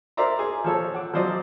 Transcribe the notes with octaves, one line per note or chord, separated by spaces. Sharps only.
A#4 C5 D5 E5 A#5 C6
G#4
F3 A4 C#5
F#5 D6
F3 F#3 C5 D5 D#5